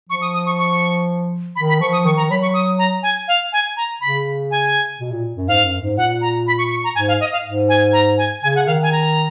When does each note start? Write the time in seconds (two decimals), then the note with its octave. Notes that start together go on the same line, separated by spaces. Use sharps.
0.09 F3 C#6
0.22 D#6
0.34 D#6
0.46 C#6
0.58 C#6
1.56 D#3 B5
1.69 B5
1.80 F3 C#6
1.93 D#6
2.05 D#3 C#6
2.17 A#5
2.30 F#3 B5
2.42 C#6
2.54 D#6
2.79 A#5
3.03 G#5
3.28 F5
3.53 G#5
3.77 A#5
4.01 C#3 B5
4.51 G#5
5.00 B2
5.12 A#2
5.36 F#2
5.48 G#2 F5
5.65 F#2
5.81 G#2
5.97 A#2 F#5
6.21 A#5
6.47 B5
6.58 C#6
6.70 C#6
6.84 A#5
6.95 G#2 G#5
7.08 F5
7.20 D#5
7.32 F5
7.45 G#2
7.69 G#5
7.93 A#5
8.18 G#5
8.43 C#3 G#5
8.55 F#5
8.66 D#3 F5
8.83 G#5
8.92 A#5